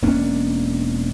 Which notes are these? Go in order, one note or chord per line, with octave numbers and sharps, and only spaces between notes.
E1 A#3 C#4 D4